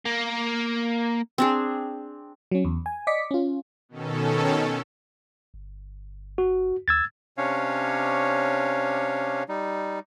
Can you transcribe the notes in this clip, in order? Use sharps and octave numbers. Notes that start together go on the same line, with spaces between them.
A#3
C4 D4 G#4
F#3 C#4
E2
G#5
D5 D#5 D6 B6 C#7
C#4 F4
B2 D#3 C#4 A4
G1
F#4
D#2 E6 G#6 A6
C3 C#4 D4 C#5 F5
G3 D#4